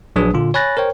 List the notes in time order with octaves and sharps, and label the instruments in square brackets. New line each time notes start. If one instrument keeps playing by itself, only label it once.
[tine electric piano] A#1 F#3 D4 G#4 B4 D#6
A#2 D3 F4
C#5 G#5 B5 F#6 A6 A#6
A#4 C5 C#5 G5